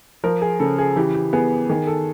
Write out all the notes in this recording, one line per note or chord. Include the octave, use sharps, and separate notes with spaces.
F3 A#4
G#4
C#3 A4
G#4
E3 G4
G4
B3 G#4
D#3 G#4
A4